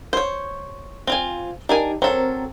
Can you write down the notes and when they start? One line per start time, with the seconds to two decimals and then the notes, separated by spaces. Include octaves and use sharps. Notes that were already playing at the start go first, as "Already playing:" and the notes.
0.13 C5 C#5
1.07 C4 F4 G#5
1.69 D4 D#4 G4 A#4 G#5
2.02 F#3 C4 A4 A#4